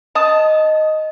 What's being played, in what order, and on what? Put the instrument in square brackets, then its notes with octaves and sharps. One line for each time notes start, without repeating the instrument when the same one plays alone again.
[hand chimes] D#5 [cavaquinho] A5 D#6